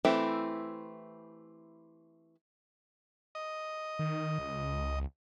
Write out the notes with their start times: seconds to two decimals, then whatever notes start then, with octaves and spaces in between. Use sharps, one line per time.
0.05 E3 A3 C4 E4 G4
3.35 D#5
3.99 D#3
4.39 C#2